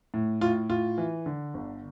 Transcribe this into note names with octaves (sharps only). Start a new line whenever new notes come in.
A2
A2 F4
A2 F4
E3
D3
G1